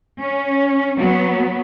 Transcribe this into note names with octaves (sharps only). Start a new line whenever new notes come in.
C#4
F#3 B3